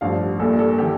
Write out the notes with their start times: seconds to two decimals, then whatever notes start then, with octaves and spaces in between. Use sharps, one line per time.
0.01 A1 G2 F3 F5
0.39 A#1 A#2 G3 A4
0.59 A4
0.78 E3 G4